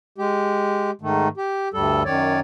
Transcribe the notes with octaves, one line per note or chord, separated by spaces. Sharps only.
G#3 G4
G#2 D#3 A3
G4
D2 G2 G3 A4
F#2 D#3 C#5 D5